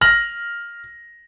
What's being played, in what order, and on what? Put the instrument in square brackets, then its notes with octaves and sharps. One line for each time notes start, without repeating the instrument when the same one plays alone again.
[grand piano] F6 A#6 F#7